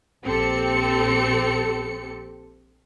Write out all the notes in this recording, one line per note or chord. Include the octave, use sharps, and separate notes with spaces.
A#1 C4 G4 A4 C#7